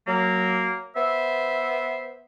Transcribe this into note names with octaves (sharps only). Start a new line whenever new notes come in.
F#3 A#3
B3 C5 E5